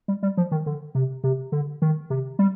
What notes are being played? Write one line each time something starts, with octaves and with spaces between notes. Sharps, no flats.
G3
G3
F3
D#3
D3
C3
C3
D3
D#3
C3
G3